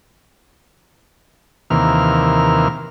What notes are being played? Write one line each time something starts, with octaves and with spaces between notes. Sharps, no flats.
D#2 C3 E3 A#3 F6